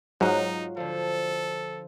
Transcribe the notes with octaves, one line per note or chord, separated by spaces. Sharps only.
G#2 F#3 D#4 F4 F#4
D3 F3 A4